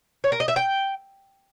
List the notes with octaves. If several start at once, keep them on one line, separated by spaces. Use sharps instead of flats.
C#5
A#4
D#5
E5
G5